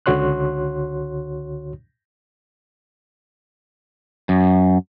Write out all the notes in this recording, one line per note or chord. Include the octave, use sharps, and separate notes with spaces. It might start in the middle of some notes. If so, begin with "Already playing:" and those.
C#2 D3 F#4 C#5 C6 F#6
F#2